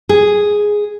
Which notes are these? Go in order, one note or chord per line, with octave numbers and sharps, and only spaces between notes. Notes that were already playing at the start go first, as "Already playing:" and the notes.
G#4